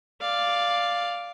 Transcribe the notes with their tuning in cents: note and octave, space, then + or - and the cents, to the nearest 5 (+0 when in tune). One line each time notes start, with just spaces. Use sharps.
D5 +0 F5 +0